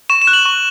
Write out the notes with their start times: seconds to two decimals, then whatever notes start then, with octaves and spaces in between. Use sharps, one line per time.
0.10 C#6 E7
0.22 E7
0.27 F#6
0.33 F#7
0.45 C#6